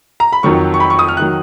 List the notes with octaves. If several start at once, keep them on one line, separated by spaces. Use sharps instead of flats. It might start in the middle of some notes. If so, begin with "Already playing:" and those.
A#5
B5
F2 D#3 F#3 C#6
C#6
B5
C#6
D#6
F6
D#3 F#3 F#6